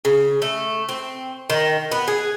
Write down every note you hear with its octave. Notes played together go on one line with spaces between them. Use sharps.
C#3
A3
C4
D#3
B3
G#4